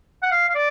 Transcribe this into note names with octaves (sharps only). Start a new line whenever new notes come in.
F#5
F5
F5
D5